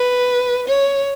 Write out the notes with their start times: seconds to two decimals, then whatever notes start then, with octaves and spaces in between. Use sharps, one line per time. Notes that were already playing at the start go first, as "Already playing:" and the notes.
Already playing: B4
0.68 C#5